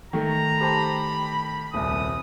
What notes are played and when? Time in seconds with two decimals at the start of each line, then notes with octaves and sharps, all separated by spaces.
0.13 D#3 A3 A#5
0.61 G4 C5 A5 B5
1.74 D#1 C2 D#6